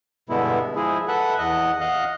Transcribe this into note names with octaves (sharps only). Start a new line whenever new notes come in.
G2 B2 D3 G#3 B3 E4
F3 G#3 E4 G#4
A4 B4 E5 F#5
E2 D#5 F#5
D#5 F5 F#5